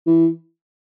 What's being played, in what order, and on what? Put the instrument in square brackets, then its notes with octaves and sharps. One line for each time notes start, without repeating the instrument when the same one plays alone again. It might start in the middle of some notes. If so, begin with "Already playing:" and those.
[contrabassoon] E3